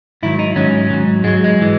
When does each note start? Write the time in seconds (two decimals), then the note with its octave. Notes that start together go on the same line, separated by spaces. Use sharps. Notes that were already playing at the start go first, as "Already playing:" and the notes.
0.23 G#2 D#3 F#3 E4
0.39 D#4
0.56 G#2 D#3 F#3 C#4
0.90 G#2 F#3
1.24 G#2 F#3 G#3
1.44 G#3
1.61 E3